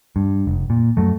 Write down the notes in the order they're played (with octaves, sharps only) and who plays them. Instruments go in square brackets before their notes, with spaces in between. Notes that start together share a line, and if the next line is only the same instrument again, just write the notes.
[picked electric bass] G2
F1
A#2
F#2 F#3 A3